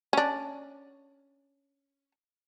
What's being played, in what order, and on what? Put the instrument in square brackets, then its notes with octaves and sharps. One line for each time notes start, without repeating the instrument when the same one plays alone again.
[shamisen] C#4 D4